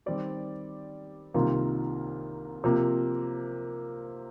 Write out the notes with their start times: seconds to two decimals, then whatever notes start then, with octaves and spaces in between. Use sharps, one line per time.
0.06 D#3 G3 C4 G4 D5
1.34 C2 C3 D#3 A#3 F4
2.64 C3 F3 A#3